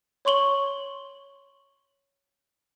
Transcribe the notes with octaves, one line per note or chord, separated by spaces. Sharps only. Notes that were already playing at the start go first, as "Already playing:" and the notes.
C#5 C6 C#6 F#7 G7